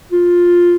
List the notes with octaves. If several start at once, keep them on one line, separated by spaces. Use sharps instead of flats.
F4